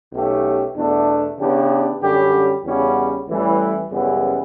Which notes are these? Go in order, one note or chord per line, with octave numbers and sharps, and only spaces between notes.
B1 B2 A3 C#4 G4
E2 B2 A3 D4
C#3 E3 B3 D4 G4
F#2 D3 G3 C#4 G4
E2 C#3 G3 C#4 F#4
A1 A2 E3 G3
F#2 C#3 E3 G3 B3